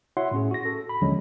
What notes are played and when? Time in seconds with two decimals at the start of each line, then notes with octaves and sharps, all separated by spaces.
0.17 E4 F#4 C#5 E5 F#5 C6
0.31 A2 C#4 G#4
0.51 F#4 A#6
0.65 A4
0.89 B5
1.01 D#2 D3 F3 F#3 G#3 C#4